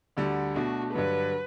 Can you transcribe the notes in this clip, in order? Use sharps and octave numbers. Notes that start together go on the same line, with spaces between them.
D2 D3 G3
B2 A3 D4 F#4
G2 D3 F#3 B4